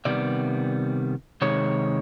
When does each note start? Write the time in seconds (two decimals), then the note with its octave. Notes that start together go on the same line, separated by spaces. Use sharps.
0.05 C3 D#3 G3 B3 D5
1.42 C3 D#3 G#3 C#5